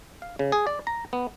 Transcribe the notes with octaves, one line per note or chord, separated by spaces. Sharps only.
F5
C#3
G#4
D5
A#5
B3